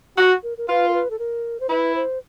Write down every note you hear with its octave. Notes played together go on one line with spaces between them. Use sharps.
F#4
A#4
A#4
F4 B4
A#4
B4
A4
A#4
C5
E4 B4
C5